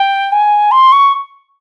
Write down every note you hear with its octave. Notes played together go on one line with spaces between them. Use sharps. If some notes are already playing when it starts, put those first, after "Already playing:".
Already playing: G5
G#5
C6
C#6